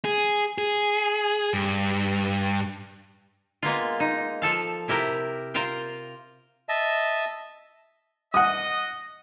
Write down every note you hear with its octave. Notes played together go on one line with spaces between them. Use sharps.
G#4
G#4
G2
G#3 A#3 B3 F4
D#4
F3 A4 F5
C3 E4 G4 A#4
F4 A#4 C5 F5 G5
D#5 E5 A5
D#5 F#5 D#6